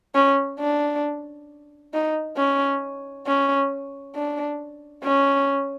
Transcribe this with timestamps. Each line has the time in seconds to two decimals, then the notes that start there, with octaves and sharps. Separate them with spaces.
0.15 C#4
0.59 D4
1.94 D#4
2.37 C#4
3.27 C#4
4.15 D4
5.04 C#4